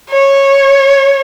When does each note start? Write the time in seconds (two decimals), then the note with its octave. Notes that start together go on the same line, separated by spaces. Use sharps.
0.10 C#5